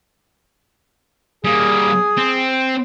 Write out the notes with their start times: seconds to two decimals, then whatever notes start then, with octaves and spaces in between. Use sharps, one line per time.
1.44 G3 A#3 G#4
2.18 C4